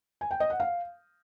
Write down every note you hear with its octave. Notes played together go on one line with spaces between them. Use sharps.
G#5
G5
D#5
F#5
F5